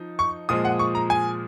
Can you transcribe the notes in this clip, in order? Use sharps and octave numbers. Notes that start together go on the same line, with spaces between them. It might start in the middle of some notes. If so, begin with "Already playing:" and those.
Already playing: F3 D#4
C#6
A#2 F3 G#3 D#6
F#5
C#6
A#5
G#5